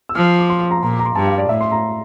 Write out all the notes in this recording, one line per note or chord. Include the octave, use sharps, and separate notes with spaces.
E6
F3 F6
D6
C6
C6
A#5
C6
A#2 A#5
D6
A#5
C6
G2 A5
F5
D5
A2 E5
C6
A#5